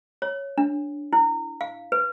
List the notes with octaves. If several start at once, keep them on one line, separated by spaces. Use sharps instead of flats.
C#5
D4
E4
F5
B4